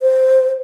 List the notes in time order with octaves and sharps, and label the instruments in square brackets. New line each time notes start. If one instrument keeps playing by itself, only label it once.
[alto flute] C5